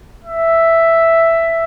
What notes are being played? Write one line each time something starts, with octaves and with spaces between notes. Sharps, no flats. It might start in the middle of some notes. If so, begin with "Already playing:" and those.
E5